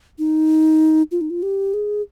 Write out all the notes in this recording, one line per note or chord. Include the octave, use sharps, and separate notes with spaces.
D#4
F4
D#4
F4
G4
G#4